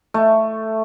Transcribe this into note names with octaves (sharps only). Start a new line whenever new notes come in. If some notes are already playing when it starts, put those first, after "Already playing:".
A3